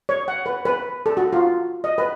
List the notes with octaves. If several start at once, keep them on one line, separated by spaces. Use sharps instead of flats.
C#5
F#5
B4
B4
A4
F#4
F4
D#5
B4